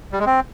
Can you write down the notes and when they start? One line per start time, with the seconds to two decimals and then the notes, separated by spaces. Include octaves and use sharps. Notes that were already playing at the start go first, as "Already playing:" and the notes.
0.12 G3
0.19 G#3
0.26 C4